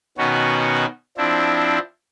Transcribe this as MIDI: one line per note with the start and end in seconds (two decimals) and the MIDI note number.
0.18 0.86 47
0.18 0.86 51
0.18 0.86 59
0.18 0.86 61
0.18 0.86 66
1.18 1.79 53
1.18 1.79 60
1.18 1.79 62
1.18 1.79 64